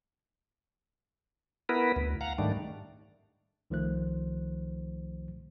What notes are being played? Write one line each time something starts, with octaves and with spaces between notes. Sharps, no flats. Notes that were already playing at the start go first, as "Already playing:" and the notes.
B3 E4 A#4 B4
D2
F5 F#5 A#5
G#2 D#3 G3 A3 D4
C2 D#3 F3 A3 C5 F#6